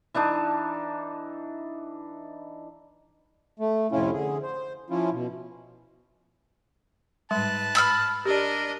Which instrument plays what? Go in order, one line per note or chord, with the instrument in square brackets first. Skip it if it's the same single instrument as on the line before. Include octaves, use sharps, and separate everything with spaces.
[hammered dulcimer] E3 D4 D#4 A5
[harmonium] A3
F2 A2 C3 C#4 E4 F4
D3 G#4
C5
F3 C#4 E4 F4
B2
[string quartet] G#2 B4 F#6 [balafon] G3 G#3 C6 [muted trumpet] A5
[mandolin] B5 E6 F6
[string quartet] D4 D5 D#5 [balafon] G4 [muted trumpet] A#4